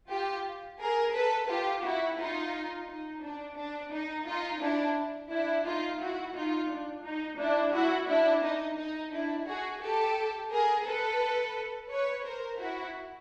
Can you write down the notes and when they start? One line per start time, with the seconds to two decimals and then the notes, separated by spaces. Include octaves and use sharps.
0.10 F4 G4
0.80 G#4 A#4
1.14 A4 B4
1.48 F4 G4
1.83 E4 F#4
2.19 D#4 F4
2.87 D#4
3.23 D4
3.57 D4
3.92 D#4
4.27 D#4 F4
4.61 D4 E4
5.31 D4 E4
5.66 D#4 F4
6.00 E4 F#4
6.35 D#4 F4
6.70 D4
7.04 D#4
7.39 D4 E4
7.73 E4 F#4
8.08 D4 E4
8.43 D#4
8.79 D#4
9.12 D4 E4
9.47 F#4 G#4
9.82 G4 A4
10.51 G#4 A#4
10.86 A4 B4
11.90 B4 C#5
12.25 A#4 C5
12.59 E4 F#4